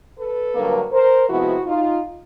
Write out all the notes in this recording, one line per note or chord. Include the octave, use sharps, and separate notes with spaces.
A4 B4
G2 D3 F#3 A#3
A#4 C5
C3 F3 G#3 B3 E4 F#4
D#4 F4